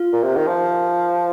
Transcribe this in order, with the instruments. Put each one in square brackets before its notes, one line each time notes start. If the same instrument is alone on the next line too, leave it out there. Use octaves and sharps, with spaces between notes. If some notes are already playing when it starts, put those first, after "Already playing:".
Already playing: [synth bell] F4
[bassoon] A#2
C3
D#3
F3